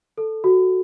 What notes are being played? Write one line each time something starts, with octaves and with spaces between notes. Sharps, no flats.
A4
F#4